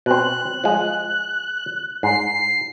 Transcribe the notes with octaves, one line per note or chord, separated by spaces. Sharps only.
B2 C4 F#6
F3 G#3
G#2 C7